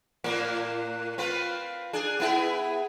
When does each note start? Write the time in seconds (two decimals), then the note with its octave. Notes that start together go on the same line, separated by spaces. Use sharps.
0.24 A2 A#3 C4
1.18 C4 F4 B4
1.93 D4 G#4
2.20 B3 E4 G#4